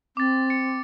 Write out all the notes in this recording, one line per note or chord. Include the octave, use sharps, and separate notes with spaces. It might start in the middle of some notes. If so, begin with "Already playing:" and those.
C4 D6 A6
C#7